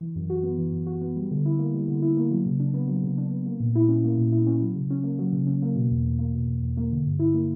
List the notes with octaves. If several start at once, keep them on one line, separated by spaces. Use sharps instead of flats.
E3
F#2
F#4
B3
E3
F#2
F#4
B3
G3
D3
E4
A#3
G3
D3
E4
A#3
F#3
C#3
D4
B3
F#3
C#3
D4
B3
A#3
A#2
E4
C#4
A#3
A#2
E4
C#4
F#3
C#3
C#4
A#3
F#3
C#3
C#4
A#3
B2
E2
E2
A#3
B2
E2
E2
A#3
D3
G2
E4
A#3